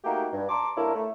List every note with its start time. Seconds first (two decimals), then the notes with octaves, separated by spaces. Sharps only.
0.04 A3 A#3 D#4 F#4 G4
0.33 G2
0.49 A5 A#5 C6 D6
0.77 G2 A#3 E4 A4 A#4 C#5
0.94 A3